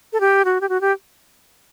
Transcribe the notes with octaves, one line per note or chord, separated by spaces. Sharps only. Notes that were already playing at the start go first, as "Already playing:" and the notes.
A4
G4
F#4
G4
F#4
G4